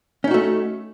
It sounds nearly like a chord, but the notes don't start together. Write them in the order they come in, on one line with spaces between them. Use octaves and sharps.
C#4 D#4 F#4 A3